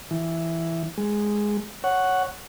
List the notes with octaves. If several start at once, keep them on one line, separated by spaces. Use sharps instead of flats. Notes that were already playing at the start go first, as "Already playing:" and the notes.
E3
G#3
C#5 F#5